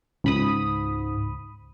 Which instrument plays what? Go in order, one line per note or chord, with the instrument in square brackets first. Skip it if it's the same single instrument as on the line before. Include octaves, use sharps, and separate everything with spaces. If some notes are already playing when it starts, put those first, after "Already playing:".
[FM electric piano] C#2 B5 D#6 [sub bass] G#2